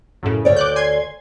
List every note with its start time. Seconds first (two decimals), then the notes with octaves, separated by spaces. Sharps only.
0.23 F#2 A2 C#3
0.45 D2 C#5 D5
0.56 D6 F#6 G6
0.76 G#5 C6 G#6